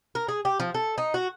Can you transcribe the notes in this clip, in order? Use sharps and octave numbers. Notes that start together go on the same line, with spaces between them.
A#4
G#4
G4
F3
A4
D#4
F#4